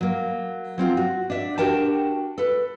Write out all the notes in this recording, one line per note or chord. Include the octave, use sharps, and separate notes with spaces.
F#3 A#3
F#3 C4 F4
F#4
D4 E5
D4 F#4 G4 A#4 G5 A5
A4 B4